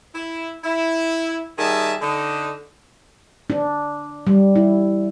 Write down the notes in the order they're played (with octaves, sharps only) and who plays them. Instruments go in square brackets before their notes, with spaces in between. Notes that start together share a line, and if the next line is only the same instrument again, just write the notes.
[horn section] E4
E4
D#3 G3 G#4 E5 A5
D3 D#4
[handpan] D4
G3
E4